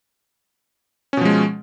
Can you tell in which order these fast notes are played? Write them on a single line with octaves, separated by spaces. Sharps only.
C#4 B2 F3 G#3